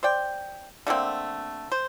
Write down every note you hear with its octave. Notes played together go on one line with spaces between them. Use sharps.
C5 D5 G5
D3 A3 A#3 C4
C5